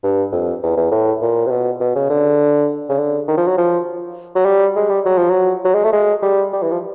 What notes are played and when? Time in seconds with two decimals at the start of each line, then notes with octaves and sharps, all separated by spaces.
0.04 G2
0.32 F2
0.63 E2
0.77 E2
0.92 A2
1.22 A#2
1.46 C3
1.50 B2
1.80 B2
1.96 C#3
2.10 D3
2.89 C#3
2.98 D3
3.28 D#3
3.38 F3
3.47 F#3
3.58 F3
4.35 F#3
4.45 G3
4.76 G#3
4.90 G3
5.05 F#3
5.17 F3
5.30 F#3
5.65 F#3
5.74 G#3
5.84 A3
5.93 G#3
6.22 G3
6.53 G3
6.62 E3
6.71 F3